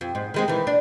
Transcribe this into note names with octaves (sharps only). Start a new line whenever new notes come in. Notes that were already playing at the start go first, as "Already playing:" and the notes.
F2
G#2
D#3 G#3 C4
D#3 E3
D4